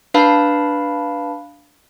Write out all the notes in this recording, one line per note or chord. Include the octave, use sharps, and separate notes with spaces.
D4 B4 F5 A5 B5